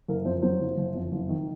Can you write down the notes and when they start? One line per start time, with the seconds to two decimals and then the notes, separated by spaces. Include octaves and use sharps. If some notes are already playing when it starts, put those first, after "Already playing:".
0.08 F#1 A#4
0.25 F2 C5
0.42 F#3 C5
0.60 F#1
0.77 F#1
0.95 F2
1.12 F#1
1.29 D#3